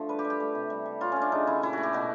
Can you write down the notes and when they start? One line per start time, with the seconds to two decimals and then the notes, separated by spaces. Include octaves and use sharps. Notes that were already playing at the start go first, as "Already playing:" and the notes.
Already playing: D3 F3 A3
0.09 G3 B4
0.19 G4
0.25 G3
0.30 G4
0.40 A3
0.55 C3
0.70 G3
0.86 G3
1.01 F#3 F4
1.12 A3 C#4
1.22 D4
1.32 C#3 D#4
1.47 C#3 E4
1.62 A#2 E4
1.73 A3 F#4
1.83 G4
1.93 B2 F#4